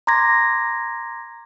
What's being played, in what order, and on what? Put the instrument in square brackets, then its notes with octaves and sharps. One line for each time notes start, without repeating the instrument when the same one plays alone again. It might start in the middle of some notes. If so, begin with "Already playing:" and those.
[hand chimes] A#5 C6 D6 G#6 A#6